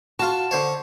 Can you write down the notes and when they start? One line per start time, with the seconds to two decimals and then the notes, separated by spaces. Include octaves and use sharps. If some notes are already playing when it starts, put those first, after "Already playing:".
0.19 F4 F#4 A5
0.51 D3 C5 C#5